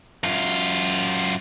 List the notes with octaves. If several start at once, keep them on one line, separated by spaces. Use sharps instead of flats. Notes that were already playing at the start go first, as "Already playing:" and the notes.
F#2 F4